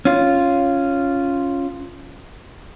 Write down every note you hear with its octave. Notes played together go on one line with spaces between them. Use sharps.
C#4 F4